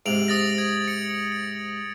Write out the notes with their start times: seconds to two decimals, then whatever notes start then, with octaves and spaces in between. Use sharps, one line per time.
0.06 G#2 C3 D7 F7 F#7
0.28 D#6 A6 A#6
0.58 G#6
0.88 C#7
1.32 C#7